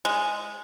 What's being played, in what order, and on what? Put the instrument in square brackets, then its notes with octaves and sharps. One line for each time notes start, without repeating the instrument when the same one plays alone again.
[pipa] G#3